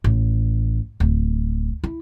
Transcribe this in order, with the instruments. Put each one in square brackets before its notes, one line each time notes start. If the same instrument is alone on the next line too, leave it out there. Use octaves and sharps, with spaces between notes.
[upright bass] A1
D1
E4